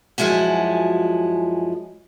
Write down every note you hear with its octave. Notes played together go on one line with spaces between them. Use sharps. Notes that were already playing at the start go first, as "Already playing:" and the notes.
F#2 F3 G#3 E4 F#4